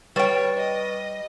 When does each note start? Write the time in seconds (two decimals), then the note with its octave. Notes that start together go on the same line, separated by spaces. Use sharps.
0.16 G3 B4 C#5 G5 C#6 A6
0.57 D#5